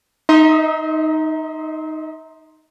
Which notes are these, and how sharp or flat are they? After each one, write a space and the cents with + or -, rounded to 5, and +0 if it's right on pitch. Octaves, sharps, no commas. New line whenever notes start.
D#4 +0 E5 -45 C6 +0